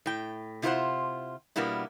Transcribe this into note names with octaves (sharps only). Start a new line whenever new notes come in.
A2 G5
C3 E4 F4 G4 C5 F#5
B2 G3 A#3 B3 D4 E4